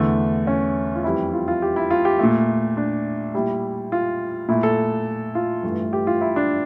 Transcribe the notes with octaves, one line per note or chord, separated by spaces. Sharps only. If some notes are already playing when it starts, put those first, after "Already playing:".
Already playing: E2 D3 A3
C#4
F4
F2 E3 G3 E4
F4
F4
G4
E4
F4
G4
A#2 A3
D4
A#2 G3 E4
F4
A#2 A3 E4
A4
F4
G2 E3 A3
G4
F4
E4
D4